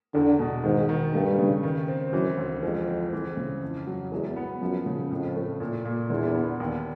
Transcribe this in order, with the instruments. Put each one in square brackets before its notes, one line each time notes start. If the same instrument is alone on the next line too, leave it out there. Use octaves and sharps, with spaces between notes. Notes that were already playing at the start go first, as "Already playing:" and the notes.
[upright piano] E2 [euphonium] D3
[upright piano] B2
[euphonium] G#2 [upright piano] D#3
[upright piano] D#3
[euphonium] G2 [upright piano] A3
[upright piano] C#3
D#3
C4
[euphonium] F#2 [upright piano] E3
[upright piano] D2
[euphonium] F2 [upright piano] G#3
[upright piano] C4
E3
C#3
F2
F#3
[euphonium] E2 [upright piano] G#3
[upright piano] B3
[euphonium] F#2 [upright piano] F3
[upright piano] C#3
[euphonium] F2 [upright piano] A2
[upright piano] A3
A#2
A#2
[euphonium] E2 [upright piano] D3
[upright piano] B3
D#2